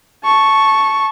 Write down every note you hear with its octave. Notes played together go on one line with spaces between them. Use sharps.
A5 C#6